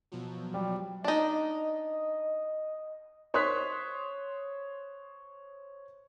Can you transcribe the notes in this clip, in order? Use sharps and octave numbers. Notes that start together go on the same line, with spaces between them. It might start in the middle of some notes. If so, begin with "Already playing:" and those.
B2 F3 F#3
G3
D4 D#4 D#5
C5 C#5 C6 D#6 F#6 B6